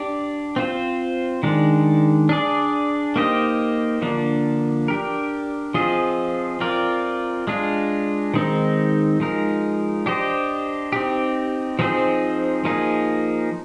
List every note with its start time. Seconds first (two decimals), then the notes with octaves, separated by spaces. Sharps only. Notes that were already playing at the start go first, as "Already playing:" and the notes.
Already playing: D4 G4 D5
0.56 C4 F4 C5
1.43 D#3 G#3 D4
2.29 D4 G#4 D5
3.16 A#3 D#4 G4 C5 D#5
4.02 D3 F3 A#3 D4
4.88 D4 G4 A#4
5.74 F3 C4 F4 G#4 D#5
6.61 C4 F4 A#4 D5
7.47 G#3 D4 F4
8.34 D#3 G#3 C4 D#4
9.20 F3 G#3 D#4 A#4
10.06 D4 G4 C5 D#5
10.92 C4 D#4 G4
11.79 F3 C4 D#4 G#4 C5
12.65 F3 A#3 D#4 G#4